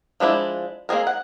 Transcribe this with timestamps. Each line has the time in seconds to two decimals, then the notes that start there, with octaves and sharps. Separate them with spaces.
0.20 F3 G#3 D4 E4
0.89 A#3 C4 G#4 A#4
1.07 F#5